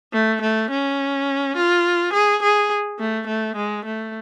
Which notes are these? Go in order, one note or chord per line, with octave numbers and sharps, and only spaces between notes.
A3
A3
C#4
F4
G#4
G#4
A3
A3
G#3
A3